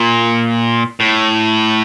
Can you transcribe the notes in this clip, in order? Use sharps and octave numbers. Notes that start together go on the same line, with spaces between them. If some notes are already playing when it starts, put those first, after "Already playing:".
Already playing: A#2
A2